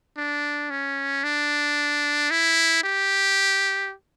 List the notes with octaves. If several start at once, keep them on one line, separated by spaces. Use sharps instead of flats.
D4
C#4
D4
E4
G4